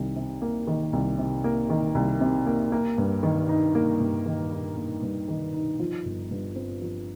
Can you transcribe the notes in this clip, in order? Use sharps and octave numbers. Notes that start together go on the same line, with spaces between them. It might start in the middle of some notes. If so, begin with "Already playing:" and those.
Already playing: C2 D#3
C3
A#3
D#3
C2
C3
A#3
D#3
C2
C3
A#3
A#3
G2
D#3
D#4
A#3
G2
D#3
D#4
A#3
G2
D#3
D#4
F3
G1
G2
C4
F3